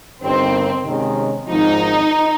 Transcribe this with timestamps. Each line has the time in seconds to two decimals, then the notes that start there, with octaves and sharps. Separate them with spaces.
0.23 G1 G2 D#3 C4
0.85 C3 D#3 G#3 C#4
1.48 G#1 G#2 F3 D#4